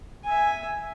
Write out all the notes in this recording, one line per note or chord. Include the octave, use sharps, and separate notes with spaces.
E5 G#5